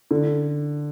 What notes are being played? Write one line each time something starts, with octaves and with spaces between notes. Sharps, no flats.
D3